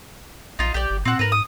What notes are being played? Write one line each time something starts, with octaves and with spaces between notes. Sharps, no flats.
A#1 D#4 F4
A#1 G4 D5
G1
A#2 C4 F#5
G#2 A#4 B4
D#6